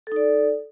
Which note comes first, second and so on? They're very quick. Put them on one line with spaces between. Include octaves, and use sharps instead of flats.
A4 D#4 D5